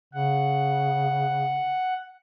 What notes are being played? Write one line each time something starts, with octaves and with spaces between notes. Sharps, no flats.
C#3 F#5